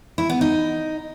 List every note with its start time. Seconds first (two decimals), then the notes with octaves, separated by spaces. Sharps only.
0.18 E4
0.30 B3
0.41 D#4